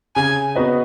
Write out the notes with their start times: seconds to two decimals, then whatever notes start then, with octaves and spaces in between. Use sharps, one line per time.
0.16 C#3 G#5
0.55 B3 F#4 B4 D#5